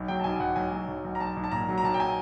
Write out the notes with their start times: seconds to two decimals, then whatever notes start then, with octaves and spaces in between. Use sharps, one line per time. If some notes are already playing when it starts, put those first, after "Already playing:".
Already playing: B1
0.08 F#3 G5
0.20 A5
0.24 B1 G#5
0.40 B1 F#5
0.56 B1 G#5
0.72 F#3
0.88 B1
1.04 B1
1.15 A#5
1.20 B1 A5
1.37 B1
1.44 A5
1.51 A#2 A#5
1.69 F#3
1.78 A#5
1.83 B1 A5
1.94 G5
2.00 G#5